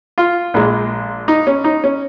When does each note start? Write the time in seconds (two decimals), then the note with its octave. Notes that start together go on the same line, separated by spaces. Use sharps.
0.18 F4
0.54 A#1 A#2 G#3
1.28 D#4
1.47 C#4
1.64 D#4
1.84 C#4